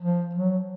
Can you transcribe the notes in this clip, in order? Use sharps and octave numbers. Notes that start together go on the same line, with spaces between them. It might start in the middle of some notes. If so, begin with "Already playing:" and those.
F3
F#3